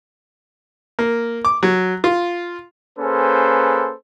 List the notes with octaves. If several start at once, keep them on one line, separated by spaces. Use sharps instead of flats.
A#3
D6
F#3
F4
A#3 C#4 G#4 A4 B4 C5